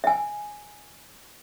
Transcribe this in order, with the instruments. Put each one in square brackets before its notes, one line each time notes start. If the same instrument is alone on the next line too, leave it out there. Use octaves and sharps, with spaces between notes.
[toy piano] E5 G#5